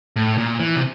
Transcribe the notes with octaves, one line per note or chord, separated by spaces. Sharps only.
A2
A#2
E3
C3